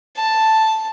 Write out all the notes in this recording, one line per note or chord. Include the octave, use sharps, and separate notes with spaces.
A5